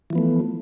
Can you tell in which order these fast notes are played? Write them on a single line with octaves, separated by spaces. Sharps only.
E3 F3 B3 A3